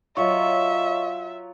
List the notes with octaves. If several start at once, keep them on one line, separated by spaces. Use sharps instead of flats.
F#3 F4 C#5 D#5 E5 C#6